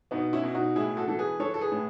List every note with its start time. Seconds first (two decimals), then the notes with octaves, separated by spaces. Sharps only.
0.11 B2 B3 D#4
0.33 C#4 E4
0.43 B2
0.55 D#4 F#4
0.76 A2 E4 G#4
0.97 F#4 A4
1.08 E3 A4
1.19 G#4 B4
1.40 E3 A4 C#5
1.54 A4
1.61 G#4 B4
1.72 A2